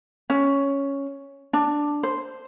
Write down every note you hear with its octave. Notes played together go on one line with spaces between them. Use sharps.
C#4
D4
C5